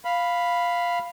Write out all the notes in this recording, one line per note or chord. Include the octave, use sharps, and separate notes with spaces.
F5 B5